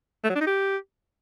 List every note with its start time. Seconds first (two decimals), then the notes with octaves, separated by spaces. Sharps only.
0.24 A3
0.30 F#3
0.35 D4
0.41 D#4
0.47 G4